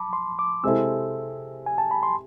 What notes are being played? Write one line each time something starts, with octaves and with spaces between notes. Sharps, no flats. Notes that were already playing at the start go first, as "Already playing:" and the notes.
Already playing: A5 B5 D6
C6
D6
C3 G#3 C4 E4 A4 E6
G#5
A5
B5
C6